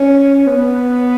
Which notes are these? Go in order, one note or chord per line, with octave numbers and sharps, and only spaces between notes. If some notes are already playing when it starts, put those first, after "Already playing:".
Already playing: C#4
B3